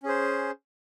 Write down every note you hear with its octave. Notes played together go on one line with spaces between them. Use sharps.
C#4 G#4 C5